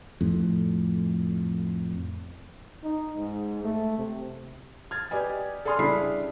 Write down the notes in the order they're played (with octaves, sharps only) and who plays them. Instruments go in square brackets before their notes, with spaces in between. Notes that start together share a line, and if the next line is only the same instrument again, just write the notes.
[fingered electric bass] F2 A2
[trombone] D#4
G#2
A3
C3
[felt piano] F6 G#6 A6
G4 B4 D5 D#5 G#5
A4 D5 G#5 C6 D#6 F6
C#3 G3 D4 E4 B5 C7